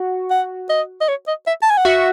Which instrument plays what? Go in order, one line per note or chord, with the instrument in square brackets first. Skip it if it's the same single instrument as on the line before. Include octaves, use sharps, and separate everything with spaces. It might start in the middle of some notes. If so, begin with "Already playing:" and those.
Already playing: [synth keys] F#4
[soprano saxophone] F#5
D#5
D#5
C#5
D#5
E5
A5
G#5
F#5
[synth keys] F#4 [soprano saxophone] E5